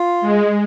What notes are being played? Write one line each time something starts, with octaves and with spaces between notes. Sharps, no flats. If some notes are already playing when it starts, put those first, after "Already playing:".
Already playing: F4
G#3